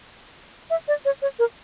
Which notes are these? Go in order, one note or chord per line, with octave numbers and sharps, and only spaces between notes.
E5
D5
C#5
C#5
A#4